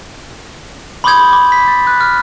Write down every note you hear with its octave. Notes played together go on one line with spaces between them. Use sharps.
B5 C6 D6 D#6 G6 G#6
D6
B6
A6
F#6
F6